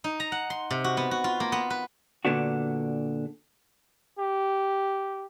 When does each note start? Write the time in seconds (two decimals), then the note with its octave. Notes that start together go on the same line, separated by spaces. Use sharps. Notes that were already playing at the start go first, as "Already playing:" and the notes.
0.04 D#4
0.20 A#5
0.32 F#5
0.50 C6
0.70 C3
0.84 F#4
0.97 B3
1.11 F#4
1.24 F4
1.40 A#3
1.52 B3
1.70 B4
2.25 A#2 D3 B3 D4 F#4
4.19 G4